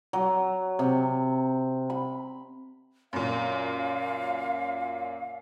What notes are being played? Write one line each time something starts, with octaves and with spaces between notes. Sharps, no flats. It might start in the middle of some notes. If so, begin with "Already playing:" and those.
F#3
C3
B5
F#2 A#2 F5